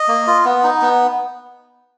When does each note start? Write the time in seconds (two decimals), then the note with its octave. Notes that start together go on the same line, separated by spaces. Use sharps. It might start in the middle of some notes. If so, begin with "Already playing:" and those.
Already playing: D#5
0.08 A#3
0.27 F4
0.45 B3
0.64 D#4
0.82 B3